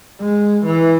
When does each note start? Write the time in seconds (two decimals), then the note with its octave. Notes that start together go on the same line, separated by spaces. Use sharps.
0.20 G#3
0.64 E3